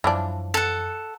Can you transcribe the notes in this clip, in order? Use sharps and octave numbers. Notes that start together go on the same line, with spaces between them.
F#2 E3 F3 D4
A4 F#5